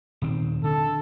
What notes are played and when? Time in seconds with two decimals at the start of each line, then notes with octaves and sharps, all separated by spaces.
0.22 D#1 D#3 C4
0.64 D3 A4